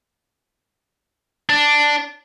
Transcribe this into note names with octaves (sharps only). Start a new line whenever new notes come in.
D4